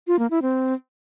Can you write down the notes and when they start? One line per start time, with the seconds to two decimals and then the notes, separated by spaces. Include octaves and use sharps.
0.08 F4
0.19 A#3
0.31 E4
0.42 C4